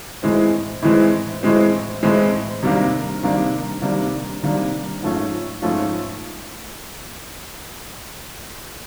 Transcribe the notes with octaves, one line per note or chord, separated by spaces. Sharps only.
A2 E3 G#3 C4
A2 E3 G#3 C4
A2 E3 G#3 C4
A2 E3 G#3 C4
C3 D#3 G3 A#3 D4
C3 D#3 G3 A#3 D4
C3 D#3 G3 A#3 D4
C3 D#3 G3 A#3 D4
G#2 F3 A3 C#4 F4
G#2 F3 A3 C#4 F4